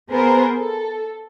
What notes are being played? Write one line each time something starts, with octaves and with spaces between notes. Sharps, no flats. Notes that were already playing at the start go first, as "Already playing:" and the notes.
B3 G#4 A#4 C5
A4